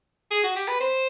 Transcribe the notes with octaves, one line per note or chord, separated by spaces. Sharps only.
G#4
F#4
G4
B4
C5